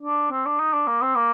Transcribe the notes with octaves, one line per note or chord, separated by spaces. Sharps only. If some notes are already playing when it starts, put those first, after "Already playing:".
D4
C4
D4
D#4
D4
A#3
C4
A#3